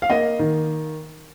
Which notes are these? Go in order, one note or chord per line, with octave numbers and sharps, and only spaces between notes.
F5
A#3 D#5
D#3